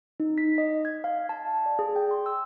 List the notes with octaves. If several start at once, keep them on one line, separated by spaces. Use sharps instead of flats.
D#4
B6
D#5
G#6
F5
A5
D5
G#4
G5
C6
E6